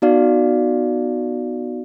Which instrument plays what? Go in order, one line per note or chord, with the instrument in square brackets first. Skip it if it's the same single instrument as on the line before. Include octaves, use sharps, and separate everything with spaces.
[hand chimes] B3 D#4 F#4 D5 F5